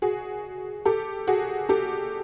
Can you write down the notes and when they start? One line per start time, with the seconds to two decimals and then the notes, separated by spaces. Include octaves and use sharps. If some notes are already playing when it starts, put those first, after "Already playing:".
0.02 F#4 G#4
0.85 G4 A4
1.27 F#4 G#4
1.69 G4 A4